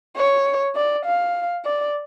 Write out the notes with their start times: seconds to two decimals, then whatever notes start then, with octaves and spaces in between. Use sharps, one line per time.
0.17 C#5
0.76 D5
1.05 F5
1.65 D5